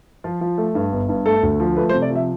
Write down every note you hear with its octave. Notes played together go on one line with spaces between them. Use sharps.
F3 F4
F3
A3
G2
G1
G2
A3 A4
D2
F3
A3 B4
C5
C3
D5
F3 E5